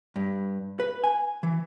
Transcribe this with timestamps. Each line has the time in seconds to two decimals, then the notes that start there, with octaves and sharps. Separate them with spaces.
0.16 G2
0.80 B4
1.04 G#5
1.43 E3